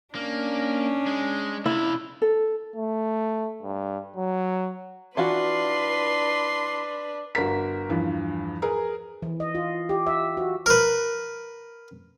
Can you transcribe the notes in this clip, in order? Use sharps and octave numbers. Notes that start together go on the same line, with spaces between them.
A#3 C#4 D4
G#3
C3 E4 F4
A4
A3
G2
F#3
E3 D4 F4 F#4 B4 C6
G1 F#4 A#4 B6
E2 G2 F3
G#4 A#4 B4
E3
D#5
F4
G4
E5
F#4
A#4 B4